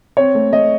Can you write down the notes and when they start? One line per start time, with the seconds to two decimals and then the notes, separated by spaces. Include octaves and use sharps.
0.17 C4 C#5
0.35 A3
0.52 A3 D#5